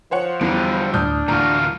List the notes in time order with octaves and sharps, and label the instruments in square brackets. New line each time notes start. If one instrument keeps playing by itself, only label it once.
[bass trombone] F3 [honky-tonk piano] C5 C#5 F#5
[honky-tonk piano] E2 [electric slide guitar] D3 G3 [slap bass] F#3
[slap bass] D2 A2 [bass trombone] D4 [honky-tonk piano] D#6 F6 G6
[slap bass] D1 D2 E3 [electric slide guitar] A2 F4 F#4 [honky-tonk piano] A#5